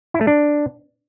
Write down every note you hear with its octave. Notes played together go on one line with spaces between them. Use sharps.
E4
A3
D4